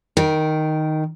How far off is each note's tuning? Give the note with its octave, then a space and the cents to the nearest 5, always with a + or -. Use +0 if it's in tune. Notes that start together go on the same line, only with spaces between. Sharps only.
D#3 +0 A#4 +0 A#5 +45